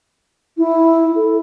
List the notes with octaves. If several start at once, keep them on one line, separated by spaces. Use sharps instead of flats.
E4
A4